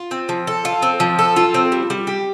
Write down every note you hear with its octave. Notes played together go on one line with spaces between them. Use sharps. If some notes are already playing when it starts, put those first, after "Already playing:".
Already playing: F4
C4
F3
A4
F4
C4
F3
A4
F4
C4
G3
G3
G4